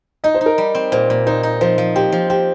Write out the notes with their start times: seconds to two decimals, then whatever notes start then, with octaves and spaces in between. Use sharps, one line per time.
0.24 D#4 D#5
0.34 C5
0.41 D#4
0.46 A#4
0.58 G3
0.75 C4
0.92 A#2 C5
1.10 A#2
1.27 D#4 C5
1.43 D#4
1.61 F3 C5
1.78 F3
1.96 C4 G4
2.12 F3
2.30 C4 G4